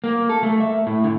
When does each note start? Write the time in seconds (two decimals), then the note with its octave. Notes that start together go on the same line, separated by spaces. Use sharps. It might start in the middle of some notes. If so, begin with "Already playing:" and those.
0.04 A#3
0.29 A4
0.43 A3
0.60 E5
0.87 A2
1.04 D3